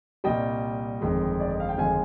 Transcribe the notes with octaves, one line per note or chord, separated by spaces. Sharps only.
C2 A#2 G3 D#5 G5
G1 F2 D#3 G#3
D5
D#5
F5
G5
G1 F2 D#3 G#3 F5 G#5